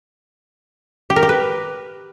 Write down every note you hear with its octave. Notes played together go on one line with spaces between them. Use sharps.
G4
A#4
G4
B4